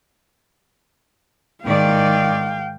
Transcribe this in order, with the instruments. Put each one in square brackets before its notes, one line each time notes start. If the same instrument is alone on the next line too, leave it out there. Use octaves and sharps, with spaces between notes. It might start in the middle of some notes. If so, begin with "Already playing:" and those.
[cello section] G#2 D#3 D5 [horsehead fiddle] F5 G5